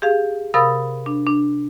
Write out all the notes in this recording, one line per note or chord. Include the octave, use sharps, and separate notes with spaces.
G4 G#4 F5
C3 A#4 F5 B5 D#6 A6
D4
D4